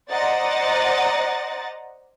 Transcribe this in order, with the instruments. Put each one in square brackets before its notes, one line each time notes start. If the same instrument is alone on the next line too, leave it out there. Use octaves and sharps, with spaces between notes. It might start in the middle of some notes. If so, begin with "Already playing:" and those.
[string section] C5 D5 D#5 F#5 A#5 A6